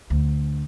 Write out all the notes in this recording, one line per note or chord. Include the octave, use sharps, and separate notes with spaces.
D2